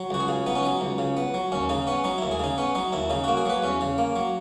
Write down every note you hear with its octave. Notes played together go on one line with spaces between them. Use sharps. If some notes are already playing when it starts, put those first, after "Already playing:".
Already playing: F#3
C#2 F#4
G#4
C#3
B3 D#4
C#4
F#3 D#4
C#2
C#3
B3
F#3
D#2 C#4
C#3 D#4
B3 C#4
F#3 D#4
D#2 E4
G#4
C#3 D#4
B3 C#4
F#3 D#4
D#2 E4
C#3 D#4
A#3 F#4
G#4
F#3 B4
E2 C#4
C#3
A#3
F#3